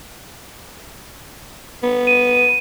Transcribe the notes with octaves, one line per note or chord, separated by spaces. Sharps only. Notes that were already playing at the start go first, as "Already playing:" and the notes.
B3
D#7